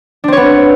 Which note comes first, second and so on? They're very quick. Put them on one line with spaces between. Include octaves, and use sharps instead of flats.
D4 C4 C#5 B3